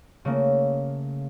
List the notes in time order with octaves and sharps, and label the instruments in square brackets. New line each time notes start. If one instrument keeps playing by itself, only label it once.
[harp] C#3 A3 A#3